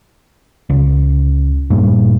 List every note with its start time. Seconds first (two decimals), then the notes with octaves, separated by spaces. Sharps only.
0.70 C#2
1.70 G2 A#2